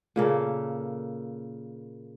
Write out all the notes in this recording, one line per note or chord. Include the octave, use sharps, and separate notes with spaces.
A#2 C#3 A#3 A4